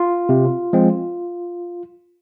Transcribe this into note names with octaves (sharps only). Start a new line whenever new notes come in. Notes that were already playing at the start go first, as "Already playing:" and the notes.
Already playing: F4
C3
F3 G#3 C4